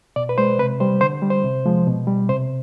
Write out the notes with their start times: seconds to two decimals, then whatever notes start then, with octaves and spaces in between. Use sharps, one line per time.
0.16 B2 D5
0.29 B4
0.38 G#3 C5
0.59 C3 B4
0.80 G3 C5
1.01 D3 C5
1.22 G3
1.30 C5
1.44 C3
1.66 F3 G#3
1.87 B2
2.07 G3
2.29 C3 C5